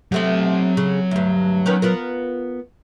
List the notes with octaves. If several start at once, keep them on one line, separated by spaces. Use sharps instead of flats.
C3 F#3 A3 C4 C6
C#3
D2 G2
D#3 B3 C#4
B3 F4 A#4